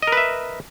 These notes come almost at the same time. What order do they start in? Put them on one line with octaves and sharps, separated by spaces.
D#5 A#4 B4 E5